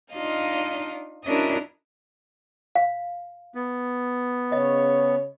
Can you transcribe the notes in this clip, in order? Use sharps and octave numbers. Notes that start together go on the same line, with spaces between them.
D4 D#4 F4 D#5 F5
C#4 D4 E4 F#4 A#4 D#5
F5
B3
C#3 C#5 D#5